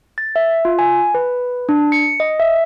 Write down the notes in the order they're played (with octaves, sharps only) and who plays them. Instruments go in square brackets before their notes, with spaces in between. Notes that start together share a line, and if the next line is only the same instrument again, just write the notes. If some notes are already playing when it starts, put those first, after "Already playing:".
[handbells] A6
E5
F4
G#5
B4
D4
C#7
D#5
E5